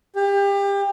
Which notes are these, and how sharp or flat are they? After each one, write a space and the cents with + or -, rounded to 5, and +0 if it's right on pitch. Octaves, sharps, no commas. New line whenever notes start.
G4 +30